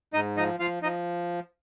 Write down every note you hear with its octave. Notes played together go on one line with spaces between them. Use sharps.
G#2 D#4 D#5
F3 D#4 D#5
F3 F4 F5
F3 D#4 D#5